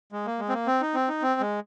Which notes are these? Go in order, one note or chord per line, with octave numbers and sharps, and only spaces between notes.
G#3
A#3
G#3
C4
A#3
C4
D#4
C4
D#4
C4
G#3